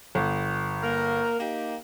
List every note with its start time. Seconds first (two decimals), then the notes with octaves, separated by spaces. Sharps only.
0.15 G1
0.82 A#3 A#4
1.40 A#3 D#4 G4